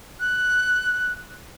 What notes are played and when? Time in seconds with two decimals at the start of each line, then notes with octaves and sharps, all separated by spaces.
0.20 F#6